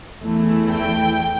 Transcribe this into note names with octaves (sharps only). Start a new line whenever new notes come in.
E2 E3 A3 E4
G5